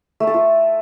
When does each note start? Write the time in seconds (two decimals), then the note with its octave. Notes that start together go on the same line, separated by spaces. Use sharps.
0.20 A3
0.27 A4
0.34 F4